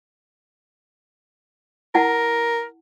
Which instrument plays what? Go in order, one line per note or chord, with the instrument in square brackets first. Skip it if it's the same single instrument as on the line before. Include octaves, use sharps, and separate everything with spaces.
[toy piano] E4 F#5 A5 [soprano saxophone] A#4